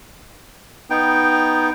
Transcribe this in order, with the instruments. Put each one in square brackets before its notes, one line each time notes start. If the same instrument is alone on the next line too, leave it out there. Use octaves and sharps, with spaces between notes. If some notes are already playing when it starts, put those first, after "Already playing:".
[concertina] B3 D#4 G5